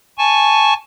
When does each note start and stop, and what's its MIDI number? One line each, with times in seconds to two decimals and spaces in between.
0.18 0.74 80
0.18 0.74 81
0.18 0.74 85